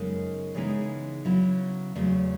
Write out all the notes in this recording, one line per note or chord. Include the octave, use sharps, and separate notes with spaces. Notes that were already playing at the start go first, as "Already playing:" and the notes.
Already playing: F#2 C#3 G#3 B3 D#4
C#3 E3 G#3 B3 D#4
C#3 F#3 B3 E4
E2 C#3 F#3 A3